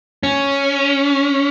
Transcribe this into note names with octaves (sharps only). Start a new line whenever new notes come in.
C#4